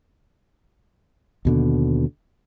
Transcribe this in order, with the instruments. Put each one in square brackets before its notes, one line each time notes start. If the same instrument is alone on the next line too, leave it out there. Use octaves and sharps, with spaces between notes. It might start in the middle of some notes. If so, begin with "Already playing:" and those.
[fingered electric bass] D#2 B2 D3